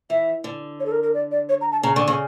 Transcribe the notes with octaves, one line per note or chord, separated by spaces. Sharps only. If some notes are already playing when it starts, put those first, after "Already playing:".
E3 E5
D3
C#5
A4
A#4
A#4
D5
D5
C#5
A#5
A5
C#3 A#5
D3 C#6
C#3 C#6